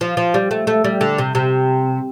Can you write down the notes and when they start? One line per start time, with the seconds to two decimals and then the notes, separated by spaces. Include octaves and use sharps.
0.01 F3
0.17 F3
0.34 G3
0.51 A3
0.67 A3
0.84 G3
1.01 D3
1.18 C3
1.35 C3